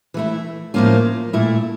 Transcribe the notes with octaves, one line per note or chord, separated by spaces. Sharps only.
E3 A3 E4
A2 F3 A#3 C#4 F4
A#2 A3 E4